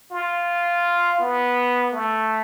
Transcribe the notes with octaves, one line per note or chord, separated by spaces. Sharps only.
F4
B3
A3